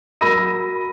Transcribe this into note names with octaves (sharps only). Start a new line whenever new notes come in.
F#3 A#4 B5 E6 A#6 D#7